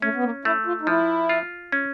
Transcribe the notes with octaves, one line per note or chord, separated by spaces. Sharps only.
A3 C#4
B3
A#3
A3 E4
F4
D#4
F3 E4
F4
C#4